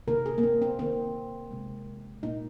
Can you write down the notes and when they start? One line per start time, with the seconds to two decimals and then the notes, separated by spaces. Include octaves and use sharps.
0.08 C3 D#3 A#3 A#4
0.26 G#4
0.38 A#3
0.43 C4
0.62 C4
0.79 D#3 A#3 C4
1.51 C3 G#3
2.23 A#2 A#3 D#4